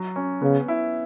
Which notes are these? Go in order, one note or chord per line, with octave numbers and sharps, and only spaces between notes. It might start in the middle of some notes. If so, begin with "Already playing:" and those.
Already playing: F#3
C#4
C#3 B3
E4